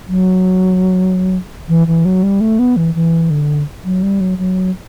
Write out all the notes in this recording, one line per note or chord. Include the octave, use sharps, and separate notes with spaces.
F#3
E3
E3
F#3
G3
A3
B3
E3
E3
D3
F#3
G3
F#3
F#3